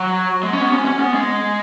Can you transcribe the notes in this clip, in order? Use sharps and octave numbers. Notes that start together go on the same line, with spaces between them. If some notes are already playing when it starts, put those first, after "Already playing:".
Already playing: F#3
G#3
C#4
B3
C#4
C#4
B3
G#3